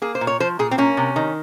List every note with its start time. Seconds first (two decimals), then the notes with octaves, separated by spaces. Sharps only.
0.02 A#3 G#4
0.15 C5
0.21 A#2
0.27 C#5
0.40 F3 C5
0.59 A#2 G#4
0.71 C4
0.78 A#3 C#4
0.97 C3
1.16 D#3